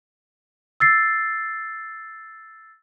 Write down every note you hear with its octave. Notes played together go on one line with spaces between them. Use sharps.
E6 A6 C7